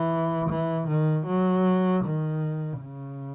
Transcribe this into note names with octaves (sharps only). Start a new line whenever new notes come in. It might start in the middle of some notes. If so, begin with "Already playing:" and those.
Already playing: E3
E3
D#3
F#3
D#3
C#3